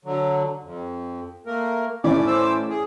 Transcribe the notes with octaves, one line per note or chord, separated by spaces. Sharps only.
D3 F#3
F2
A3 A#3 A#4
A2 E3 C#4 D5 D6
C5 D6 E6
G#4